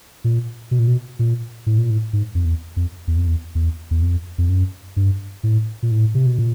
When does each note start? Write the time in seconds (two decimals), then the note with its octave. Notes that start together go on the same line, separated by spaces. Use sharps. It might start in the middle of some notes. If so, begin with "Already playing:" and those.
0.24 A#2
0.71 B2
0.79 A#2
0.88 B2
1.19 A#2
1.66 A2
1.78 A#2
1.90 A2
2.13 G#2
2.35 F2
2.45 E2
2.76 F2
3.08 E2
3.17 F2
3.27 E2
3.55 E2
3.91 E2
4.02 F2
4.38 F2
4.49 F#2
4.96 G2
5.43 A2
5.83 A#2
5.91 A2
6.15 C3
6.26 B2
6.39 A#2